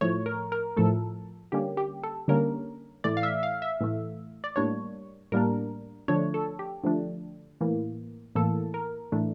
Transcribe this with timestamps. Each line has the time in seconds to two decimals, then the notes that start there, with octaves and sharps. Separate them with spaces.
0.01 A2 F3 A3 C#5
0.26 A#4
0.52 A#4
0.77 A2 F3 A3 A4
1.52 D3 G3 A#3 C#4 G4
1.77 G4
2.04 A4
2.28 D3 G3 A#3 C#4 A#4
3.04 A2 E3 A3 D5
3.17 F5
3.23 E5
3.43 F5
3.62 E5
3.81 A2 E3 A3
4.44 D5
4.56 A2 G3 A#3 D4 C#5
5.32 A2 G3 A#3 D4 A#4
6.08 D3 F3 A3 D4 C#5
6.34 A4
6.59 G4
6.84 D3 F3 A3 D4
7.61 A2 E3 A#3
8.35 A2 E3 A#3 A4
8.74 A#4
9.12 A2 E3 A3 D4